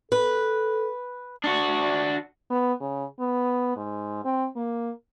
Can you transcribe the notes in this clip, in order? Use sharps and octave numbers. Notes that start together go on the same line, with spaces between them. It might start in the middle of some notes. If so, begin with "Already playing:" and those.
A4 B4
D4 F#4
B3
C#3
B3
G#2
C4
A#3